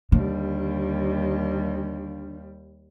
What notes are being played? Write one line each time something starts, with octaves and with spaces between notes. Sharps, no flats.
D#2 D3 G3